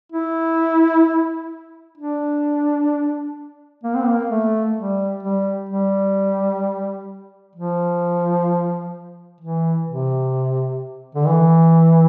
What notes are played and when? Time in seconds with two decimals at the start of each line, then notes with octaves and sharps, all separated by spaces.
0.12 E4
1.98 D4
3.83 A#3
3.95 C4
4.06 A#3
4.30 A3
4.76 G3
5.23 G3
5.69 G3
7.55 F3
9.41 E3
9.87 C3
11.15 D3
11.27 E3